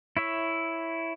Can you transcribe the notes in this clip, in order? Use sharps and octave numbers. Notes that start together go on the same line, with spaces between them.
E4 C#5 E5